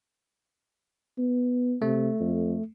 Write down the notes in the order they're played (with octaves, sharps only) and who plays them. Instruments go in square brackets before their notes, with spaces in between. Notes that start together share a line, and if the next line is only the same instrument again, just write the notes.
[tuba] B3
[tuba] C3 [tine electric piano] A3
[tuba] F2